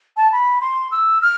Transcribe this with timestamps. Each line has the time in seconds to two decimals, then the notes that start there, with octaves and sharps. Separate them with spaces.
0.16 A5
0.32 B5
0.61 C6
0.91 E6
1.22 F6